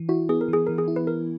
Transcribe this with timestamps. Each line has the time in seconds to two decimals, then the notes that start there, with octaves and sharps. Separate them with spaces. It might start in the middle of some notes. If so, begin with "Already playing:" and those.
Already playing: E3
0.09 E4 F#4
0.29 B3 G#4
0.41 A#4
0.48 E3 G#4
0.67 E3 A#4
0.78 G#4
0.88 E4
0.96 B4
1.07 B3 A#4